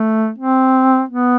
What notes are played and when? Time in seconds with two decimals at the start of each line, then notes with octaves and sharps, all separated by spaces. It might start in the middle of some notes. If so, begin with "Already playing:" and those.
Already playing: A3
0.38 C4
1.09 B3